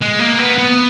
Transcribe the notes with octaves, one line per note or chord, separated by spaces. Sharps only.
G#3
A#3
B3
B3